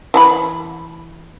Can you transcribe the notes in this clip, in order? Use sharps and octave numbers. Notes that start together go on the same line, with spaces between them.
E3 A5 B5